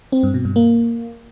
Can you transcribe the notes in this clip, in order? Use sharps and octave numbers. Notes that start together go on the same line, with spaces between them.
C4
G2
B2
G2
A#3